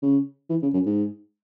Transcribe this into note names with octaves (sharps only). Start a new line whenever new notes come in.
C#3
E3
C#3
F#2
G#2